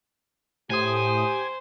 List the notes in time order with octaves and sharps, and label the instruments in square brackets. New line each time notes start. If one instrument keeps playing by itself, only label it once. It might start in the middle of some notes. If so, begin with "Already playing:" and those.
[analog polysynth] A2 D#6 [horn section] G4 [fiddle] C5 [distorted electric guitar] G#5